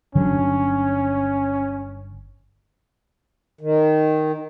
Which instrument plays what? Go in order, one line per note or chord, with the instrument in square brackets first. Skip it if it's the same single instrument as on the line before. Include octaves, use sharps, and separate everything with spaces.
[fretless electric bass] G1 D3 F#3 [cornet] C#4
[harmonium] D#3